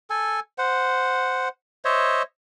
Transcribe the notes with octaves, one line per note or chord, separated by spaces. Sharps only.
A4 G#5
C5 F#5
C5 C#5 D#5 E5